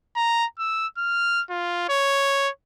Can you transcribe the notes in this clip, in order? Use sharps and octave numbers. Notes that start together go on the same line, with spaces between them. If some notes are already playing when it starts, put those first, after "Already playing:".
A#5
E6
F6
F4
C#5